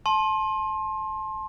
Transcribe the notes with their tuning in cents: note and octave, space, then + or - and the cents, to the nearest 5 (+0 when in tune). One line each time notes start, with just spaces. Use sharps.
A5 -20 C6 +25